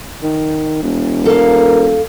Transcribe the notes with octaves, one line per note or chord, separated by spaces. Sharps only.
D#3
E1
A4 A#4 F5